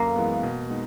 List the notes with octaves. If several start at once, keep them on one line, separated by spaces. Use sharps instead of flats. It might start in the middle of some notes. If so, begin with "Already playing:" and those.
Already playing: F#2 A#3
E3 G#3 B3
B2
G#3 B3 D#4